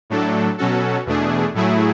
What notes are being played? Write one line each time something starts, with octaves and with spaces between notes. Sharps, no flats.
A2 F#3 A3 D4 A4
B2 F#3 C#4 F#4 A4
E2 B2 A3 D4 G#4
A2 F#3 A3 E4 G#4